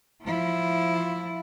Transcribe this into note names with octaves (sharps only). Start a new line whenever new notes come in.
F3 E4